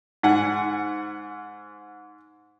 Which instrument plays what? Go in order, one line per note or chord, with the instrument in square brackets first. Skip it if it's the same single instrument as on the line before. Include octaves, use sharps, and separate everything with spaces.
[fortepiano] G#2 F#5 G#5